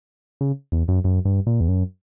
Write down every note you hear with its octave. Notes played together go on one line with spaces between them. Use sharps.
C#3
E2
F#2
F#2
G2
A#2
E2
F#2